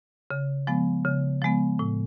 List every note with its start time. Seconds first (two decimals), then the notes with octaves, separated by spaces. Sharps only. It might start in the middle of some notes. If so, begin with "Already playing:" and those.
0.31 C#3
0.67 F3 G#3 B3
1.05 C#3
1.42 F3 G#3 B3
1.79 A2